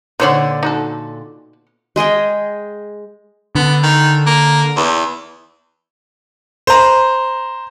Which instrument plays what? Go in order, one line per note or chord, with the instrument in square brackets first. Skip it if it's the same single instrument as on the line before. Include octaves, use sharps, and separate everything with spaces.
[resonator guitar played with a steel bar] A#2 D3 [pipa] B3 C#5 F#5 [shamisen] D#4 C5
[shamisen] D#4 F#4 A4
[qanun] G#3 G#4 D#5 G5
[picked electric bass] D3 [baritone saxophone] B3
[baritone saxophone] D#3
A#3
E2
[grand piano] C5 A#5